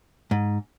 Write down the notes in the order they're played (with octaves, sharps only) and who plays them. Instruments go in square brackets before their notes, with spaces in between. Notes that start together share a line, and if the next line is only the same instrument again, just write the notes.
[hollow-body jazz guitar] G#2